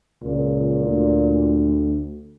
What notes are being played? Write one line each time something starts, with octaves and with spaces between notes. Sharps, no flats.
C#2 A#2
D2